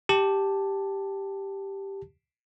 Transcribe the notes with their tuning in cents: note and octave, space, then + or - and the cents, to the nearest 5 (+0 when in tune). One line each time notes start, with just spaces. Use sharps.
G4 +0 A5 +0